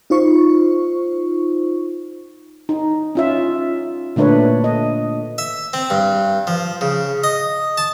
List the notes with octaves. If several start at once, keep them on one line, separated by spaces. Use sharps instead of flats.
D#4 F4 C5 C#6
D#4
C#4 F4 E5
A#2 D3 A3 D4 B4 C#5
D#5
E5
C4
G2
F3
C#3
D#5
A5